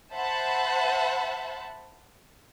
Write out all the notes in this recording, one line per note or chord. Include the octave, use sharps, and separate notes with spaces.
C5 E5 F#5 A5 B5